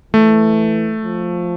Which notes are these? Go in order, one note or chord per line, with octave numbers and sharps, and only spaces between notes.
E3 A3
F3